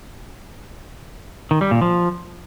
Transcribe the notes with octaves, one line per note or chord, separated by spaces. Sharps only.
D#3
G3
A#2
F3